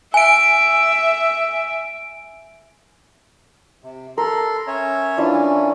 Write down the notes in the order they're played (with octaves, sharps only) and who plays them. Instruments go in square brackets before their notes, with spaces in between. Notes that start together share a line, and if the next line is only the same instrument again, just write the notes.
[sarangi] E5 [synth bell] G#5 D7
[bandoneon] C3
[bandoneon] A4 C6 [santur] A#4 B5
[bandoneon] C#4 C#5 E5
[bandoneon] E3 C#4 [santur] D4 E4 F4